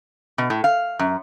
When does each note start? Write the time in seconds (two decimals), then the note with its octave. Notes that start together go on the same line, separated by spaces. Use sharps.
0.38 B2
0.50 A2
0.64 F5
0.99 F#2